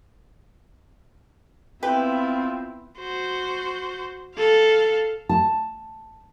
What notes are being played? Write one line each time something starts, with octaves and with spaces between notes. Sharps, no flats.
B3 C4 E4 F4 G4 B4
F#4 C5
A4 F5
A5